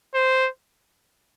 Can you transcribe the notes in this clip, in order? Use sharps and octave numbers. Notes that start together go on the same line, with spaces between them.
C5